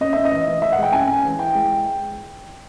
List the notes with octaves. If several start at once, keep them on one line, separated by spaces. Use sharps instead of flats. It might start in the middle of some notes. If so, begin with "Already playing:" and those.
C#4 D#5
C#4 E5
D#5
E3
E3
E3 E5
F#5
G#3 G5
C#4 G#5
C#4
E3
E4 G5
G#3